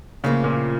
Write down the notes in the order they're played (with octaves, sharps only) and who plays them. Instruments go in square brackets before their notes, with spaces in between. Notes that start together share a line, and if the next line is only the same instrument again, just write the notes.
[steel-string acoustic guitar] A2 F3 A#3 F4 [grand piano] C#3
[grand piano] A#2